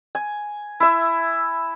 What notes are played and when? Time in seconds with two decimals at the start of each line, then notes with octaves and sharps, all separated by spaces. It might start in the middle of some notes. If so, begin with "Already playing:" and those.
0.15 G#5
0.80 E4 E5